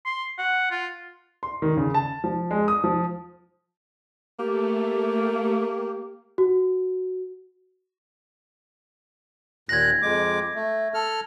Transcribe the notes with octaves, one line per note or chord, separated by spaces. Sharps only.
C6
F#5
F4
C6
D#3
C#3
A5
F3
G#3
D#6
F3
A3 A#3 G4
F#4
D#2 A#2 F#6 G#6 A#6
F2 G#3 D6
A3
A4 F6